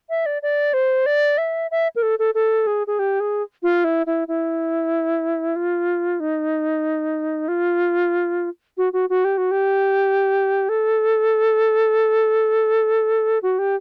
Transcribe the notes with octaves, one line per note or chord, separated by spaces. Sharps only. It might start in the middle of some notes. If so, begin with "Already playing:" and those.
E5
D5
D5
C5
D5
E5
E5
A#4
A4
A4
A4
G#4
G#4
G4
G#4
F4
E4
E4
E4
F4
D#4
F4
F#4
F#4
F#4
G4
F#4
G4
A4
F#4
G4